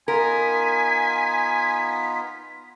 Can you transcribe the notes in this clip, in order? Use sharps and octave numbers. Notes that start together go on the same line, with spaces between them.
B3 D#4 F4 A#4 G#5 B6